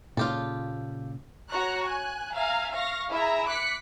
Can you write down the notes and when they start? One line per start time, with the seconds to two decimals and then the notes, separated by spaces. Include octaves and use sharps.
0.17 A#2 C#3 F4 G4 A4
1.50 F#4 C#5 A#5 C#6 F#6
1.85 G#5 F#6
2.33 E5 F5 G#5 A#5
2.73 F5 C#6 A#6
3.10 E4 G#4 E5 A#5
3.48 D6 F#6 B6 C#7